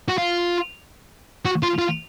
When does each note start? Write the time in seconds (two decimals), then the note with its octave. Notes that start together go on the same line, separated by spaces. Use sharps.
0.08 F#4
0.18 F4
1.45 F#4
1.63 F4
1.79 F4